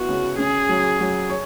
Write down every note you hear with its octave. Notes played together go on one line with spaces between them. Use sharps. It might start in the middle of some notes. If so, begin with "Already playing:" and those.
Already playing: B3 E4 F#4
C#3
C#4 G#4
F#3
F#3
C#5